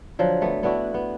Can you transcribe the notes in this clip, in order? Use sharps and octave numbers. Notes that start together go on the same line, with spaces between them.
D3 F3 F#3
A3 B3
B3 D4 E4 F#4
B3